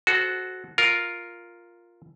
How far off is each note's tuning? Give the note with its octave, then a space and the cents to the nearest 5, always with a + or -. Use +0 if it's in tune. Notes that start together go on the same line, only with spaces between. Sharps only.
F#4 +0 A4 -30 C5 +0
F4 +0 A#4 +0